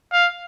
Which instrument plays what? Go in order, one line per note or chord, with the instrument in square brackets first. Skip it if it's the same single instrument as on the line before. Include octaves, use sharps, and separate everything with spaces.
[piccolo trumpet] F5